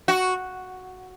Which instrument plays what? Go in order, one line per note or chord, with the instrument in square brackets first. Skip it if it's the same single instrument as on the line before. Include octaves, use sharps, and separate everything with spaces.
[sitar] F#4